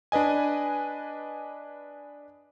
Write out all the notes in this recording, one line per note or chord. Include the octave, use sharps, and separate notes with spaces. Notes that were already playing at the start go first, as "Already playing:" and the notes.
D4 B4 D#5 G#5